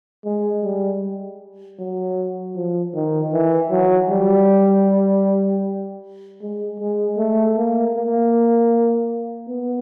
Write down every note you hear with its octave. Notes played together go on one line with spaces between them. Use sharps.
G#3
G3
F#3
F3
D#3
E3
F#3
G3
G#3
G#3
A3
A#3
A#3
B3